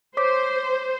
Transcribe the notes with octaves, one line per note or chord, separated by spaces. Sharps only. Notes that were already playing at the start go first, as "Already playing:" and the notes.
C5 C#5 D6 B6